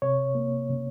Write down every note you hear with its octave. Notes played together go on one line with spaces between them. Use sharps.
C3 C#5
A#3
C#3